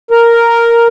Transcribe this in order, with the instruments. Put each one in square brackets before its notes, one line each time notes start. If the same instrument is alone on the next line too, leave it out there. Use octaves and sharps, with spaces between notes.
[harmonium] A#4